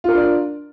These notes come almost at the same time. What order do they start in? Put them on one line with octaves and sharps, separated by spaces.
F4 A#4 D4 D5